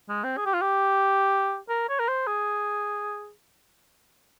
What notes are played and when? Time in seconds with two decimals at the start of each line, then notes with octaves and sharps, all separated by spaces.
0.09 G#3
0.24 C4
0.37 G#4
0.46 G4
0.54 F4
0.61 G4
1.69 A#4
1.89 C#5
1.99 A#4
2.08 C5
2.27 G#4